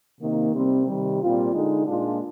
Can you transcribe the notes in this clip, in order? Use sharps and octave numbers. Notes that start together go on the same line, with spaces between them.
C3 D#3 A#3 D#4
C3 G3 C4
C3 D#3 G3
A#2 G3 C4 F4
D3 G#3 D#4
A#2 G#3 D4 F4